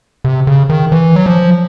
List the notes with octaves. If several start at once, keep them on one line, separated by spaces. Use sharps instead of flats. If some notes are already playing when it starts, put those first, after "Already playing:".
C3
C#3
D#3
E3
F#3
F3